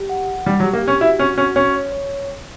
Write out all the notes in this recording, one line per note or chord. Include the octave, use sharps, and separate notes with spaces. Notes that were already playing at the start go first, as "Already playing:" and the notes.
Already playing: G4
F#5
F#5
G3 G4
F#3
G4
A#3
G4
C#4
E4 F#4
C#4 F#4
C#4 F#4
C#4 C#5
C#5
C#5